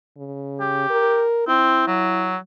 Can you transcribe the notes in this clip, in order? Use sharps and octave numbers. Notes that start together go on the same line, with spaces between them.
C#3
G4
A#4
C4 E4
F#3